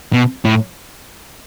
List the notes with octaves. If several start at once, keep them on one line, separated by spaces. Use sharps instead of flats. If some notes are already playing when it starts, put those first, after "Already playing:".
B2
A2